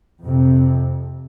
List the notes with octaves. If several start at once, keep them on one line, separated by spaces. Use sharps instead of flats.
F2 C3